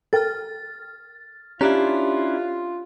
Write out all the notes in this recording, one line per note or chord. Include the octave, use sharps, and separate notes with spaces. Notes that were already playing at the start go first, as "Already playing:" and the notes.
A4 A#4 G5 F6 A6
C#4 D4 E4 F4 G4 A#5 F#6